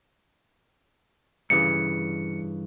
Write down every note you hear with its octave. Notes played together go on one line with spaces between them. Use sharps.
G2 C#3 E3 C#7